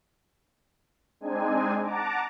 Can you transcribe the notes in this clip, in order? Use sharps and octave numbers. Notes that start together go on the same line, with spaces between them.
G#3 C4 D4 D#4 G#5
F#5 A5 A#5 D6